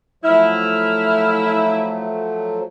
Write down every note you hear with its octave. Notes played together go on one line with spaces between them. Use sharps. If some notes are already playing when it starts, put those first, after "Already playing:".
F3 F#3 A3 E4 F6